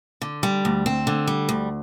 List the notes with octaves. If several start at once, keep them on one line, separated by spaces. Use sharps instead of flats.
D3
G3
D2
C4
D3
G3
D2